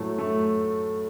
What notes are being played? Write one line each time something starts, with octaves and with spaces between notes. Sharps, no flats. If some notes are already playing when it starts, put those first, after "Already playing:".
Already playing: A2 F#3 A3
A3